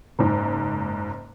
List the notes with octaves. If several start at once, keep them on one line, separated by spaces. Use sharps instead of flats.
F#1 G#2